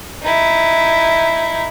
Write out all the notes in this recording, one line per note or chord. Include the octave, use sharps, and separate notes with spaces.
D#4 E4